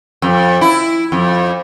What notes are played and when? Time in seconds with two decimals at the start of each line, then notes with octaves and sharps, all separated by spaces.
0.22 F2
0.61 E4
1.12 F2